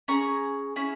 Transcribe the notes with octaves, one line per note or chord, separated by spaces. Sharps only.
C#4 G#4 A#5 C#6
C#4 E4 G#4